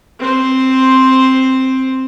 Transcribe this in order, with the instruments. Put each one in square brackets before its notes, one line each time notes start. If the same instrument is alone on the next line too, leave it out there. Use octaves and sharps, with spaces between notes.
[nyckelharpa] C4 C5